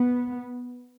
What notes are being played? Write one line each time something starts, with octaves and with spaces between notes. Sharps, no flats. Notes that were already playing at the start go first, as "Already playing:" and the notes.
Already playing: B3